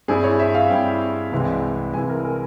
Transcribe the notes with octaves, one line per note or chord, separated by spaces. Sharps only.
G2 G3 C4 E4 G#4
C#5
E5
F5
G2 G3 C4 E4 G5
C2 C3 E3 G#3 E4
C2 C3 E3 G#3 E4 G#5
A#4
A#4